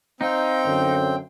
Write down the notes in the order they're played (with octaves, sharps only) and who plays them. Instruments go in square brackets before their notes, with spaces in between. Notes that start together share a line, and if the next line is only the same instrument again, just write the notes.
[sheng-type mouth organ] C4 G5 [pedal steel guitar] D#4 [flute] F5
[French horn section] F#2 D3